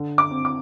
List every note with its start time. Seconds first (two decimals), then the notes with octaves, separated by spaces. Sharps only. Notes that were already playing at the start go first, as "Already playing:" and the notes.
Already playing: D3
0.18 D6
0.31 C4
0.45 D6